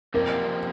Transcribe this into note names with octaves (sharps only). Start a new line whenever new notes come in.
F2 C3 G3 A#3 A#4